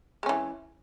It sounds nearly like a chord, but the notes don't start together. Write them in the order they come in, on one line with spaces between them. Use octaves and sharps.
G#3 C#4 E3